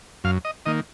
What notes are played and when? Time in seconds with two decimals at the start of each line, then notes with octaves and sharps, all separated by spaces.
0.24 F#2 F5
0.45 D#5
0.66 D#3 A#3 D#5